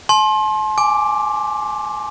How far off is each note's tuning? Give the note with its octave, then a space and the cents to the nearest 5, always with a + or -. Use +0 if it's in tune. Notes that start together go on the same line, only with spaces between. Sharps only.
A5 -40 C6 +30
G#5 +0 D6 +0